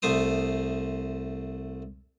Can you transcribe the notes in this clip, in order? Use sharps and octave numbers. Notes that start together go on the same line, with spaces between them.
C2 A3 C5 D#6